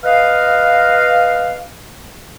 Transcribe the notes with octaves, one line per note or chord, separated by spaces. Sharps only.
B4 D#5 F5